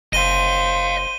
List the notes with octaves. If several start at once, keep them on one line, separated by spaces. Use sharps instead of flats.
F#1 C5 D#5 F5 D#7 G7